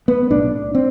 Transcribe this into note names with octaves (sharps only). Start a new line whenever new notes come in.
B3
B1 A2 D4
C4